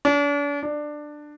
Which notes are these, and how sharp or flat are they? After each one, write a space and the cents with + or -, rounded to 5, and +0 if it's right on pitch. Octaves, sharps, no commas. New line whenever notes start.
D4 -40
D4 +15